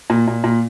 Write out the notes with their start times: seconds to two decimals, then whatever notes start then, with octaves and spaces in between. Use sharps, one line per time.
0.10 A#2
0.28 A#2
0.44 A#2